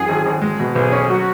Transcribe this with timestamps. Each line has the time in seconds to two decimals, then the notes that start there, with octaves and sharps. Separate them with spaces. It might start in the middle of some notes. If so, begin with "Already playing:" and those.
Already playing: F#2 E3 G#4
0.09 G#1
0.26 G#1
0.41 G#3
0.60 B2
0.75 B1 G#4
0.92 C#4
1.09 F#3 F#4